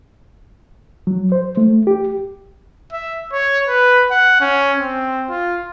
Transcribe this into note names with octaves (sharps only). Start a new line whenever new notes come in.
F#3
C5
A3
G4
E5
C#5
B4
F#5
C#4
C4
F4